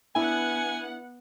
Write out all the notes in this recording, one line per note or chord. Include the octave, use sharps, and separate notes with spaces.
B3 D4 E4 F#5 G#5